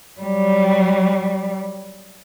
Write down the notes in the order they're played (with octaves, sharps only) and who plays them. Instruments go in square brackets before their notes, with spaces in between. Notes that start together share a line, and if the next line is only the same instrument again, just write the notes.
[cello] F#3 G3